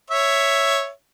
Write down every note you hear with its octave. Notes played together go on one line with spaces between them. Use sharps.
C#5 E5